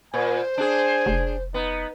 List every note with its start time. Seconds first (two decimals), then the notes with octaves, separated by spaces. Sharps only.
0.14 A#2 C5 G#5
0.58 D4 G#4 G#5
1.06 F1
1.54 B3 D#4